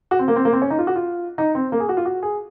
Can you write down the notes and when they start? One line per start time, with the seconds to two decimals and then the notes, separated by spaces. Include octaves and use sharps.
0.11 F#4
0.19 C4
0.28 A#3
0.36 C4
0.45 A#3
0.53 C4
0.62 C#4
0.70 D#4
0.79 F4
0.87 F#4
0.96 F4
1.38 D#4
1.55 C4
1.72 A#3
1.80 G#4
1.89 F#4
1.97 F4
2.05 F#4
2.23 G#4